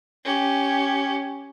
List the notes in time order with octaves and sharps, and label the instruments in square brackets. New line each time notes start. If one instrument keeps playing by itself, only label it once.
[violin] C#4 G4